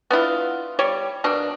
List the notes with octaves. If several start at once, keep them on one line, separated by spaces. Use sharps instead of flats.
B3 D4 E4 F4
G3 C#5 D5
B2 A#3 D4